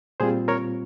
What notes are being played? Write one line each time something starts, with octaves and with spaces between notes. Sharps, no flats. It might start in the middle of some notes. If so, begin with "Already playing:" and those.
A#2 G3 C4 F4 G#4 C5
A#4 C#5